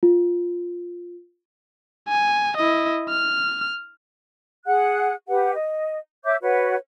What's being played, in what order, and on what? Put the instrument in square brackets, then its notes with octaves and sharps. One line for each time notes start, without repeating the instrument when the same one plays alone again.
[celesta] F4
[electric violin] G#5
E4 D#5
F6
[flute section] G#4 F#5 F#6
G4 B4 F#5
D#5
C#5 E5 D6 G6
F#4 B4 C#5 F#5